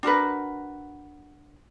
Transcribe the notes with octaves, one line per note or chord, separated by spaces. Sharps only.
D4 F#4 A#4 B4